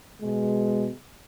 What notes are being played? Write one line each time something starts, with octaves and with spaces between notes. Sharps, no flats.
B2 G#3